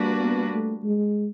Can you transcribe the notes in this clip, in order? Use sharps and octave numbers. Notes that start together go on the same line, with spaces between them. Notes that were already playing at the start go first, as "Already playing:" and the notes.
Already playing: G3 A#3 D4 F#4 B4
B3
A3
G#3